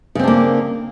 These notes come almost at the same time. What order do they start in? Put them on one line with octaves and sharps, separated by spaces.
C#3 C4 D4 A#3